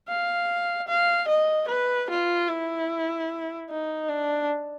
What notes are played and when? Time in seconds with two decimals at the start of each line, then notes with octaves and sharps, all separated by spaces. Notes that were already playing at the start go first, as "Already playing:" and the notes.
0.09 F5
0.88 F5
1.29 D#5
1.69 B4
2.10 F4
2.49 E4
3.70 D#4
4.09 D4